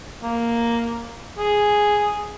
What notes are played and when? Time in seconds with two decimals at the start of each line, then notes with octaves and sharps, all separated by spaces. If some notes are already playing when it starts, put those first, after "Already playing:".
0.23 A#3
1.38 G#4